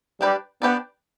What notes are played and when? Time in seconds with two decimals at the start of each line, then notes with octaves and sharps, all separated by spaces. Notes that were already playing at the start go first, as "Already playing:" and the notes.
0.21 G3 D4 G4 B4 D5
0.62 B3 D4 G4 B4 D5